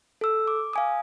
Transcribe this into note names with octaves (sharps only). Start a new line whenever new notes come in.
A4 E6
D6
F5 G#5 D#6